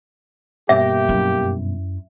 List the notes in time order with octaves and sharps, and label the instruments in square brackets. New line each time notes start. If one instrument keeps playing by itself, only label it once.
[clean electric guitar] G2 B2 [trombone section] A#3 G4 [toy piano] E5
[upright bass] F#2 E4